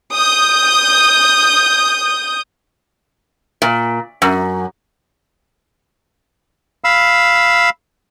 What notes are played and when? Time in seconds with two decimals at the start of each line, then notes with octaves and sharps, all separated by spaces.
0.13 D#6 G6
3.62 A#2
4.22 F#2
6.84 F5 B5 E6